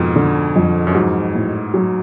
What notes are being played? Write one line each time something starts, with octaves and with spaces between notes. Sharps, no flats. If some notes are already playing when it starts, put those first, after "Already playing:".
Already playing: F2 G#2 B2
D3
F2
F#2
G#2 F#3
A2
F#3